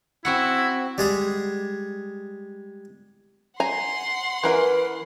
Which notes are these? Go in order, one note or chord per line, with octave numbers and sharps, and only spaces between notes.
C4 E4 F#4 F#5
G3 G#3 G#4
F#5 G#5 A#5 C6
E3 A#4 B4 G#5